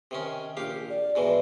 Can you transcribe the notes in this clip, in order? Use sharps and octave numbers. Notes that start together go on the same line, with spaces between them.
C3 D#3 C#4
A#1 G4 F5
D5
G#2 B2 E3 D5